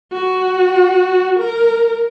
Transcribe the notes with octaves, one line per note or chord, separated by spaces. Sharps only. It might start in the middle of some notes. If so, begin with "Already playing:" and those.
F#4
A#4